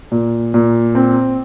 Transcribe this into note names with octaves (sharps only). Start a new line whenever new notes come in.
A#2
A#2
C4